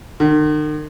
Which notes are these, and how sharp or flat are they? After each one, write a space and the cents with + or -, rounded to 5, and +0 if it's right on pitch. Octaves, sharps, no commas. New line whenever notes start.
D#3 -45